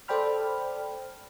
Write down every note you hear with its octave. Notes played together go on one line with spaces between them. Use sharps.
A4 C5 D5 G5 B5 F6